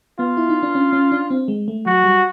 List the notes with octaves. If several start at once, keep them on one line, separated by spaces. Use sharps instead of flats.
B3 F4
E4
D#4
D4
C#4
C#4
D4
C4
G#3
A3
F#3 F#4
G3